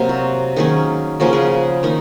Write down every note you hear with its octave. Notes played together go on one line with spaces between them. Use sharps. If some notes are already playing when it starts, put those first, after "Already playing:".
Already playing: C3 F#3 A#3
F#4
D#3 F#3 A#3 C#4 G#4
C#3 F3 A#3 C#4 F#4
G#4
F#4
D#3 A#3 D#4